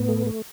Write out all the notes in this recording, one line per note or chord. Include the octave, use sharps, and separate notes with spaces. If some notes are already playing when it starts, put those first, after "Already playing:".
Already playing: A2 B3
A3
A3